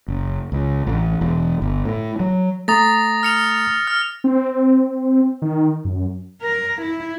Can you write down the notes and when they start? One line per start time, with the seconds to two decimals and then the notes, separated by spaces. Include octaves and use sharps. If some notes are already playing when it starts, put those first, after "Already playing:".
0.08 F#1
0.52 C#2
0.87 A1
1.21 E1
1.62 G1
1.85 A2
2.20 F#3
2.68 A3 A#5 D#6 A6 A#6
3.23 F6 C#7 F7
3.87 F6
4.24 C4
4.52 C4
5.42 D#3
5.85 F#2
6.42 A#4
6.82 E4